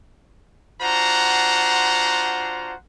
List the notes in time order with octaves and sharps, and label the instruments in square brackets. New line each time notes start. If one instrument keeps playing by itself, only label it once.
[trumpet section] D4 F4 F#4 C5 F#5 A#5